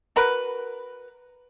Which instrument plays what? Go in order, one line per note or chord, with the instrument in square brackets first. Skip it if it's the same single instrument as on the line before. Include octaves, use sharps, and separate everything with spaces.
[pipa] F#4 A#4 B4